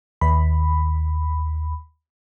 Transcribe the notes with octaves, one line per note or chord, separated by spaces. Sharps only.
D#2 B5